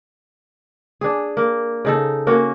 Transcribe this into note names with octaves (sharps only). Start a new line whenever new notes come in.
D4 G#4
A#3
C#3 D#4 A4
A#3 C#4 F#4